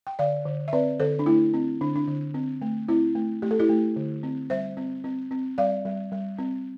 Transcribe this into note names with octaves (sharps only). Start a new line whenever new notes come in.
G5
D3 D5 F5
D3
E5
C4 B4 D5
D3 A4 C5
D4
A3 E4
C4
D3 D4
D4
D3
C4
A3
C4 E4
A3
A3 G4
A4
E4 G4
A3
D3
C4
G3 C5 E5
C4
C4
C4
G3 D5 F5
G3
G3
C4